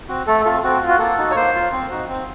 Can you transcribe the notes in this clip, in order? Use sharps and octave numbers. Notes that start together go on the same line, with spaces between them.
C4 F#4
A3 A4
C4 F4 A4
C4 F#4
F4
F#4
A#3 A4
D#4 F#4
C#5
A#3 C5
F4
C4
D#4 F#4
C4